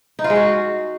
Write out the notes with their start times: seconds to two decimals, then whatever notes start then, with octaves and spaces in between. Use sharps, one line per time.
0.19 D#4
0.24 F4
0.30 G#3
0.36 F#4